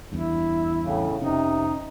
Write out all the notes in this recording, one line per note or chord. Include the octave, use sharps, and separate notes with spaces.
E2 G2 E4
A2 C#3
F1 C3 C#4 D#4